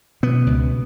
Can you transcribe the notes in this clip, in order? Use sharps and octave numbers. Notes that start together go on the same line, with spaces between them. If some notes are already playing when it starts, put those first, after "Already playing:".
B2 B3
C#2